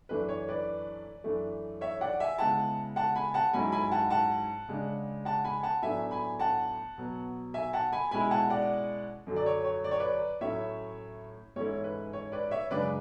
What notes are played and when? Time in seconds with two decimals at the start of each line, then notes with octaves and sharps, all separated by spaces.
0.09 F#2 E3 A3 D4 B4
0.29 C#5
0.49 B4 D5
1.24 F#2 E3 A3 D4
1.81 C#5 E5
2.01 D5 F#5
2.20 E5 G#5
2.38 C#3 G#3 B3 E4 F#5 A5
2.96 F#5 A5
3.16 G#5 B5
3.34 F#5 A5
3.53 G#2 F#3 C#4 E4 G#5 B5
3.72 G#5 B5
3.91 F#5 A5
4.10 F#5 A5
4.68 C#3 G#3 D4
5.25 F#5 A5
5.44 G#5 B5
5.63 F#5 A5
5.82 A2 F#3 B3 D4 E5 G#5
6.11 G#5 B5
6.40 F#5 A5
6.98 B2 F#3 B3
7.54 E5 G#5
7.73 F#5 A5
7.92 G#5 B5
8.11 B2 G#3 C#4 E4 G#5 B5
8.31 F#5 A5
8.50 D5 F#5
9.27 F#2 D3 F#3
9.36 D5
9.46 C#5
9.65 C#5
9.84 D5
9.91 C#5
10.00 B4 D5
10.41 A2 F#3 C#4 E4 C#5 E5
11.56 G#2 E3 A3 C#4 E4 C#5
11.84 B4
12.13 C#5
12.32 B4 D5
12.51 C#5 E5
12.70 F#2 C#3 G#3 D4 B4 D5